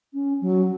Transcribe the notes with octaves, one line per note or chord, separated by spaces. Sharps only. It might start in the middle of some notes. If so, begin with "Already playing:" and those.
C#4
F#3